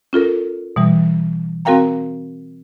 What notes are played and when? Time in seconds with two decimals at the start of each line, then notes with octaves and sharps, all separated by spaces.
0.13 C#4 F4 A4 A#4
0.76 B2 E3 G3
1.65 C4 F#4 A#4 F5 G5 A#5